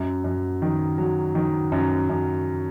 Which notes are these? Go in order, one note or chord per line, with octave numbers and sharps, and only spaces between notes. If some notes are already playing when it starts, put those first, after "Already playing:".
Already playing: F#2
F#2
D#3
F#3
D#3
F#2
F#2